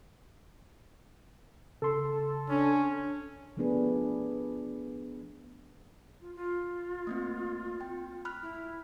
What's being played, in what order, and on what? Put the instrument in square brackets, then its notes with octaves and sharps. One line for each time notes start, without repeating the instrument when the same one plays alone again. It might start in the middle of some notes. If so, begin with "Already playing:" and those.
[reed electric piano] C#3 C6 [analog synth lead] A4
[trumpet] C#4 [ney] D4
[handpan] F3 A3 B3 D4 G#4 B4
[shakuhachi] F4
F4
[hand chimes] A3 A#3 C4
G5
B5 F6 F#6
[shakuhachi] E4